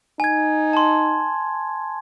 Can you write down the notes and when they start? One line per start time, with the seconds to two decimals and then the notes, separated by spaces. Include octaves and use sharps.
0.20 D#4 G#5 G#6
0.73 A5 C6